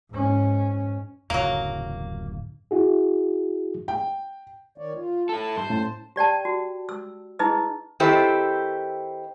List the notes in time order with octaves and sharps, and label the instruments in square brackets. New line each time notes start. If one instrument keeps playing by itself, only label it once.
[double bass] G#2 C#4
[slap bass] D1 F#2 C#3 [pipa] F#3 A#3
[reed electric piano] E4 F#4 G#4
[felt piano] G5
[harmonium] D#3 C#5 D5
F4
[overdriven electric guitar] E4 A4 [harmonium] A5
[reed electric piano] G2 [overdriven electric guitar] C5
[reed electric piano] A2 C#4
[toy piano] G4 D5 G5 A5
F#4
E6
D#4 E4 G#4 B4 D#5 E6
[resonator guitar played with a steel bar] D#3 C4 E4 G4 A4 C5